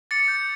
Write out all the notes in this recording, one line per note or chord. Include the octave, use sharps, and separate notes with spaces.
D6 A6 C#7
G6